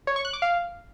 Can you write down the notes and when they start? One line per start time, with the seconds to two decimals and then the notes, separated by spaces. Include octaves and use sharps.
0.07 C#5
0.16 C#6
0.25 F#6
0.33 D6
0.42 F5